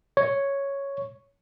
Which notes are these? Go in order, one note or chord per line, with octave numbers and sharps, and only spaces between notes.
C#5